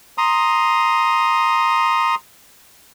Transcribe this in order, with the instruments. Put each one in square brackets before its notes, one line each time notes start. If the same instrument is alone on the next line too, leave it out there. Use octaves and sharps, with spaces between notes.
[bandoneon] A#5 C6 D#6